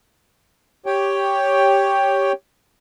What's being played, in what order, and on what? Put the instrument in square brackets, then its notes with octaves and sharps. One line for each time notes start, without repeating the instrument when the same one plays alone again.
[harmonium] G4 C#5 G5